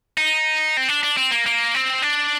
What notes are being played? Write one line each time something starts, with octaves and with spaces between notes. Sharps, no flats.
D#4
C4
D4
D4
C4
A#3
A#3
C4
D4